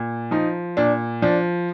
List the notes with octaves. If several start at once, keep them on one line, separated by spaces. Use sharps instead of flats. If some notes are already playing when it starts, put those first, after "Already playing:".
Already playing: A#2
F3 D#4
A#2 D4
F3 D4